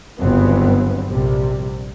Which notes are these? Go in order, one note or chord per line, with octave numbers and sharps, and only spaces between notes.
G1 D#2 C#3 F#3 B3 C4
A#1 C3 G3